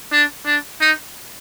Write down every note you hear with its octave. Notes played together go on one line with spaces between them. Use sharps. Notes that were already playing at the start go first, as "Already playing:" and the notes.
D4
D4
D#4